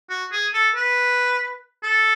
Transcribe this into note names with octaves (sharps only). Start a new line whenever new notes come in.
F#4
G#4
A4
B4
A4